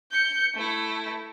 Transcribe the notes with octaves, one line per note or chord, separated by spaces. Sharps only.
G6 C#7
A3 E4